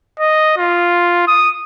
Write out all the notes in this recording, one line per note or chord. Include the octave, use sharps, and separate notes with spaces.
D#5
F4
D#6